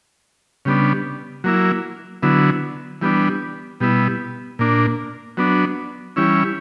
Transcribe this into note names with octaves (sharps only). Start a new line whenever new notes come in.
C#3 G3 B3 D4
F#3 A#3 E4
D3 F#3 B3 E4
E3 G3 B3 D4
B2 G3 B3 E4
A#2 A#3 D4
F#3 B3 D4
E3 G3 C#4 E4